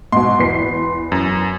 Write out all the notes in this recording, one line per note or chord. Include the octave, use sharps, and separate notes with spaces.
G#2 B2 C6
E2 B4 C7
F#2